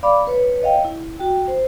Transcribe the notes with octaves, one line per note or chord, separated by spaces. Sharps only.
D5 F5 B5 D6
B4 C#5
C#5 D#5 F5 G5
E4
F#4 G5
C5